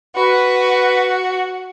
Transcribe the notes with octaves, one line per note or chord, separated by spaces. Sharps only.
F#4 B4